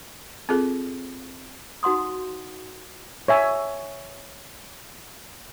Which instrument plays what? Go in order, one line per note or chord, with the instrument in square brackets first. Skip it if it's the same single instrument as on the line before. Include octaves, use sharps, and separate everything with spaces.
[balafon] C4 F4 G#4 A4
[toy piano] D#4 F#4 F#5 C6 D#6
[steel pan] C#5 E5 G#5